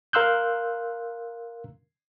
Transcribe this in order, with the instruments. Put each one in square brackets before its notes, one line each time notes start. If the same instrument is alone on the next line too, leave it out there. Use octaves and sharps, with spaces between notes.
[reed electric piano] A#4 F5 C6 E6 F#6 G6